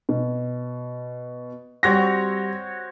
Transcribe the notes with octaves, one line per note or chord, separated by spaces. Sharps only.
B2
G3 C4 F#4 C#5 A#6